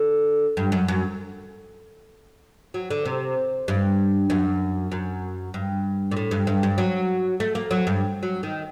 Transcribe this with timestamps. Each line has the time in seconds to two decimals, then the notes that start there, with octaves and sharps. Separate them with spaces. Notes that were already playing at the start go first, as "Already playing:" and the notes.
Already playing: D3
0.57 G2
0.72 F#2
0.88 F#2
2.74 F#3
2.91 D3
3.05 C3
3.68 G2
4.30 F#2
4.92 F#2
5.54 G2
6.11 A#2
6.16 A2
6.31 G2
6.47 G2
6.63 G2
6.78 F#3
7.40 A3
7.55 A#3
7.71 F#3
7.87 G2
8.23 F#3
8.43 D#3